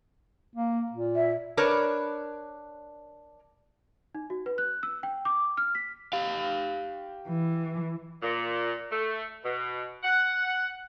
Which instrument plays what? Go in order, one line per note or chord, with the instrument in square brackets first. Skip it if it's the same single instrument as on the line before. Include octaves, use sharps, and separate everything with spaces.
[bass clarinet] A#3
A#2
[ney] E5
[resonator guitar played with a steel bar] D4 A#4 B4 C#5 D5
[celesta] D#4
F#4
B4
F#6
E6
G5
D6
F6
B6
[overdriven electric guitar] G4 F5
[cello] E3
[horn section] A#2
A3
B2
F#5